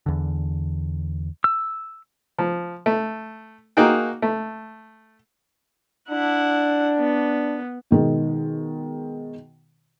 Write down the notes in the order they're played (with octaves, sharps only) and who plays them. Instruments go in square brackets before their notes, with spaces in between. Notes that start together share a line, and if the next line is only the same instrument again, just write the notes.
[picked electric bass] E2 D3
[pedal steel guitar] E6
[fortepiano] F3
A3
A#3 D#4 F#4 G#4 G5
A3
[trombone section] D4 [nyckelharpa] E4 F#5
[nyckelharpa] B3
[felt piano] B2 D#3 G#3